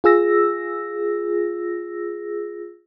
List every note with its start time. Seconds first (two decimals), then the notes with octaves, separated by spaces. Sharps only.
0.04 F4 G#4 E6 A#6